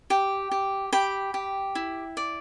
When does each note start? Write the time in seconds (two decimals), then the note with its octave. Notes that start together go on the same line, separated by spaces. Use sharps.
0.10 G4 G5
0.51 G4
0.93 G4 G5 B5
1.34 G4
1.75 E4
2.17 D5